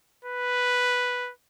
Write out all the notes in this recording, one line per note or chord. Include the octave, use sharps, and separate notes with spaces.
B4